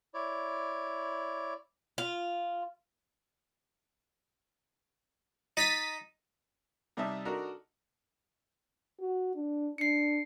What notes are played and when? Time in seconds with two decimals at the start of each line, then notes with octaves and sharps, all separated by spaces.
0.14 E4 C#5 D5
1.98 F4
5.57 D#4 A6 B6 D#7
6.97 C3 G3 D#4 E5 A5 D#6
7.25 D4 D#4 F#4 A4 A#4 A#5
8.99 F#4
9.35 D4
9.78 D4 C7 C#7